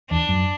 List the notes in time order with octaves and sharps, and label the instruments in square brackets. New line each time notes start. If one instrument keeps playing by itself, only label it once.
[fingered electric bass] E2 [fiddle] D4
[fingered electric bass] F#2